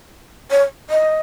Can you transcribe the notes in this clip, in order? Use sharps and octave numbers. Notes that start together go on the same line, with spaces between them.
C#5
D#5